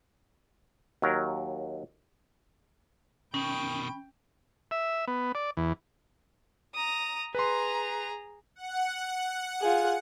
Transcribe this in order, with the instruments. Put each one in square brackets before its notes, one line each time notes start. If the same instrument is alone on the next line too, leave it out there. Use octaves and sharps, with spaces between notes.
[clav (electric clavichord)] D#2 F#3 A#4
[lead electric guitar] B2 D#3 [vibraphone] C#4 [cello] G5 [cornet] B5
[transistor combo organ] E5
B3
D5
E2
[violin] A#5 D#6
[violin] G#4 A#5 [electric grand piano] B4 C6
[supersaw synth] F#5
[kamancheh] F4 G#4